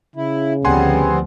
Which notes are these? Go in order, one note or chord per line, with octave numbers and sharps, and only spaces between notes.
C#3 E4
D2 F3 G3 B3 C4 F#5 G#5 C6